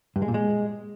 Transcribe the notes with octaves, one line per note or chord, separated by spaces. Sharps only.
G2
G#3
A#2
G#3